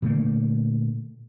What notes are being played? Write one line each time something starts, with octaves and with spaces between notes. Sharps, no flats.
A#2 D3 A3 A#3